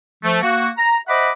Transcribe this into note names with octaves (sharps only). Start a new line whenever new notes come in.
F3 A3
A#3 F#4
A#5
C5 D#5 E5 F#5 B5 D6